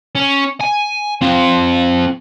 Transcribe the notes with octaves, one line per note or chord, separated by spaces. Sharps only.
C#4
G#5
C4 F4